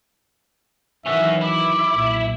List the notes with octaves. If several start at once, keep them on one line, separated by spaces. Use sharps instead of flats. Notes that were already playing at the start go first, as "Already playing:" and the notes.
D#3 E3 F#3 C#4 F#4 E5
E4 D6
B1 A#2